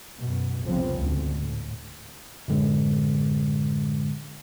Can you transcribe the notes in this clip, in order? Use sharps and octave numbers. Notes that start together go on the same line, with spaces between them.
F#2 B2
F1 C2 C#3 F3 B3 C4
D2 G#2
A2
F#2 A2 D3 G#3